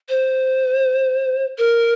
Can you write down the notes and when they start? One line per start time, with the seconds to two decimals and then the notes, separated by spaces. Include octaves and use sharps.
0.09 C5
1.58 A#4